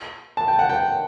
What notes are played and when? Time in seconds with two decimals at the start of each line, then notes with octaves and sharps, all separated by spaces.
0.37 A5
0.48 G5
0.59 F#5
0.69 G5